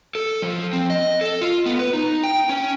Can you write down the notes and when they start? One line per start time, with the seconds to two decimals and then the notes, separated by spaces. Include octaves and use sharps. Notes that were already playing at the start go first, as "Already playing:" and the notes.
0.15 A4
0.42 F3
0.73 C4
0.90 D#5
1.21 A4
1.41 F4
1.66 B3
1.79 B4
1.93 D#4
2.24 G5
2.49 C#4